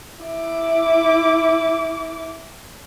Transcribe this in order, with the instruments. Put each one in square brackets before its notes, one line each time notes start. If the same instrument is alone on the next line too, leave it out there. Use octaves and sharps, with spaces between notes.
[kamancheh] E4 D6